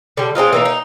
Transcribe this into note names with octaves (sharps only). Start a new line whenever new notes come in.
D3 G3
G#3 C4 D#4 F4
E3 A#3 D#4
D#4